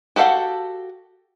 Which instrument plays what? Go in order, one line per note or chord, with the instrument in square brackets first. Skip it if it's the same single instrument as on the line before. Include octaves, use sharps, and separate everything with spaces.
[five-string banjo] F#4 G4 A4 F5 F#5